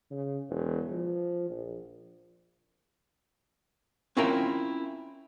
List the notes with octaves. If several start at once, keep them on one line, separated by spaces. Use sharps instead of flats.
C#3
E1
F3
A#1
C4 C#4 E4 F4 A#4 G5